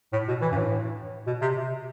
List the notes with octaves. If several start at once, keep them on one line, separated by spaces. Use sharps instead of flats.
A2
B2
E3
G2
A2
B2
C3